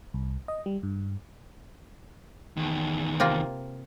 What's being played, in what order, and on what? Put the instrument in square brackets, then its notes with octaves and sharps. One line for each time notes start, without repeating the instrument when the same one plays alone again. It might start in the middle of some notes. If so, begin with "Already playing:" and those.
[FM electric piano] C2
D#5
G3
G2
[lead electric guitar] E2 D#3
[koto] C3 A#3 F4